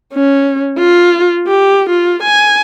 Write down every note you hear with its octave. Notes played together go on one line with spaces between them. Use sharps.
C#4
F4
G4
F4
G#5